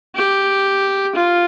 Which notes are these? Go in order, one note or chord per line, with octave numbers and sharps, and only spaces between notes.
G4
F4